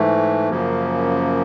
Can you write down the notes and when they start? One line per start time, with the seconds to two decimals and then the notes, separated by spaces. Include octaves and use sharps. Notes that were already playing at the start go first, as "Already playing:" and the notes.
Already playing: G#2 E3 A3
0.50 F#2 C#3 F3 A#3